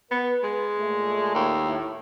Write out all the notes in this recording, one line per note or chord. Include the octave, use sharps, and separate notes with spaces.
B3 B4
G#3
A#2 A3
D#2
A2